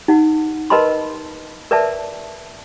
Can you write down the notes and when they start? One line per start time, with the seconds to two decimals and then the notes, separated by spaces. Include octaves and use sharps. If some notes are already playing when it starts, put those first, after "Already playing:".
0.08 D#4 F#5
0.70 A#4 B4 D#5 A5 B5 C6
1.71 A#4 B4 D5 E5 A5